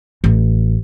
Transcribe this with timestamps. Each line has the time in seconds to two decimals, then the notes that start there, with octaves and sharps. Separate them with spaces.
0.24 A1